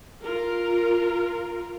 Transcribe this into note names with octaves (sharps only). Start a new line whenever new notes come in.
F4 A#4